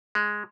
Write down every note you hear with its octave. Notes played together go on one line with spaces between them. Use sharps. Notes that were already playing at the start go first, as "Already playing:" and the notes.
G#3